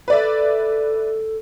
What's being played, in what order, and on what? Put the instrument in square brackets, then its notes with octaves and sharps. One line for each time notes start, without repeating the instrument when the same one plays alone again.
[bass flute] A4 [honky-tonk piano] B4 D5 E5